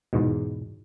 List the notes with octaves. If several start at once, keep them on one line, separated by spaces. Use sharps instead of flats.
E2 G#2 B2